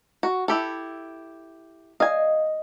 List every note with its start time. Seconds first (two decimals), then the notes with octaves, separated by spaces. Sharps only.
0.23 F#4
0.48 E4 G4 A4
2.00 D#5 F5 G#5